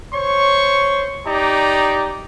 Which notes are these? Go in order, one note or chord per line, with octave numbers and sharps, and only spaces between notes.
C5 C#5 C#6
D#4 G4 D5 A#5